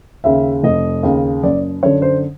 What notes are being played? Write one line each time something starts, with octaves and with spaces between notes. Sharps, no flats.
D#2 C#3 E5
F1 D#5
D#2 C#3
F#1 D5
F#2 D3 C#5
C5